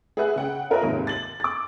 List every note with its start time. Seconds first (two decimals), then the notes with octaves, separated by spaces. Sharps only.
0.17 G#4 B4 E5 F#5 F#6
0.36 C#3 F#5 G5
0.70 F4 A#4 B4 C#5 D#5 E5
0.83 D#2 G#2 C3
1.07 A6 F#7
1.40 D6 A6